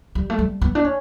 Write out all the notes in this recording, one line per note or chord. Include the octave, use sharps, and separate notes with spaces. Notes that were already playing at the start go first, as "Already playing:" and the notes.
G3
A3
G3
B3
D4
C#4